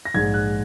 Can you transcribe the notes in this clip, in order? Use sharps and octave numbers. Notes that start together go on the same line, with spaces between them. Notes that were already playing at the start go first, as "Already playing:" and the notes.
A#6
A#1 G#2 G#3 G#6
F#6